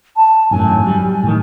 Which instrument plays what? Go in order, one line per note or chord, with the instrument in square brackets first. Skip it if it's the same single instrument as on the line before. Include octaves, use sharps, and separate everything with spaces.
[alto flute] A5
[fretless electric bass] G#1 F#2 A2 [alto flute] G#5
[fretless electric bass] F#3 G3
A2 D#3